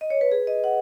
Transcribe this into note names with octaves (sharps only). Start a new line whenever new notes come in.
D#5
C#5
B4
G#4
D#5
F#5